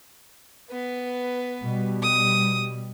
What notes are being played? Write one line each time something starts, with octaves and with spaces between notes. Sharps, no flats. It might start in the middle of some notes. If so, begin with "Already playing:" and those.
B3 B4
B2 G3
D#6